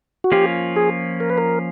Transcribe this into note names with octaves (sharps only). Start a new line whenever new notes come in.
F#4
F3 A#3 C#4 F4 G4
G#4
A#4
B4
A#4